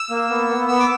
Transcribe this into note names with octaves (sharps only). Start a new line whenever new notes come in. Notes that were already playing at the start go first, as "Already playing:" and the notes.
Already playing: E6
A#3
B3
B3
B3 E6
D6